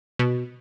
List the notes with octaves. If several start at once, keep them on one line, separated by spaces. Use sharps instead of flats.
B2